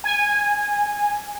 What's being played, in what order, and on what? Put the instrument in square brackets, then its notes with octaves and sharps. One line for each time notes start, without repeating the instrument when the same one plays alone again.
[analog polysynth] G#5